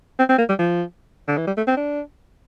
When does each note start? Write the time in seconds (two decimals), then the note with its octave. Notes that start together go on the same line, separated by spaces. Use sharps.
0.19 C4
0.29 C4
0.39 A#3
0.49 G3
0.59 F3
1.28 D3
1.38 E3
1.47 G3
1.57 A3
1.67 C4
1.77 D4